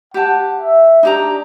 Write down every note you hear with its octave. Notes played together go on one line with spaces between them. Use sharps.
G4 F#5 A5
E5
D4 D#4 G4 A#5